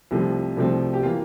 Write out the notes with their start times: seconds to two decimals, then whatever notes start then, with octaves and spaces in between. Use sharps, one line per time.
0.11 C2 C3 F3 A3 C4
0.57 C2 C3 F3 A3 C4
0.94 G4
1.03 E3 A#3 F4